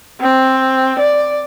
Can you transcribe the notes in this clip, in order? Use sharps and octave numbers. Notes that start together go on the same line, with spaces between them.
C4
D5